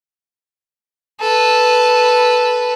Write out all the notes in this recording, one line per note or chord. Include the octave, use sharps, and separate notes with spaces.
A4 B4